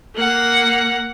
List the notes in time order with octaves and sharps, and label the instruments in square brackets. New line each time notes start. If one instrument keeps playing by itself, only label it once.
[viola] A#3 F#5